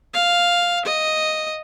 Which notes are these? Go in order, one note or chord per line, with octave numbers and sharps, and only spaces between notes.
F5
D#5